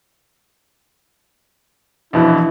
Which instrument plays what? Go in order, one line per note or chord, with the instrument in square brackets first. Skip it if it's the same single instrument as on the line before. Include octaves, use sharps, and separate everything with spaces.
[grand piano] A#1 B2 E3 [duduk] E4